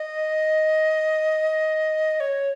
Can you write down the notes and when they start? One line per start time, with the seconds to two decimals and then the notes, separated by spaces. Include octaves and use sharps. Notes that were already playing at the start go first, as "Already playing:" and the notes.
Already playing: D#5
2.20 C#5